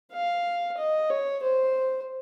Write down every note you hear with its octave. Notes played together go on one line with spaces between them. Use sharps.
F5
D#5
C#5
C5